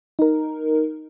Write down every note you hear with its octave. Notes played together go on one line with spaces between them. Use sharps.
D#4 A#4